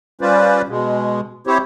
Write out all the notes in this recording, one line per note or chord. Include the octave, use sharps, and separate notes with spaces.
G3 C#4 F4 B4 C5 D5
B2 G#3
C4 E4 G4 C5 C#5